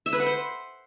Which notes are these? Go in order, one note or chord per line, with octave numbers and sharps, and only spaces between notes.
E5
B4
F#5
C5